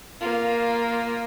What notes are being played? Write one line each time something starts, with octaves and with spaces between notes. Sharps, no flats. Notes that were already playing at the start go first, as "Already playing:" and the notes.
A#3 F4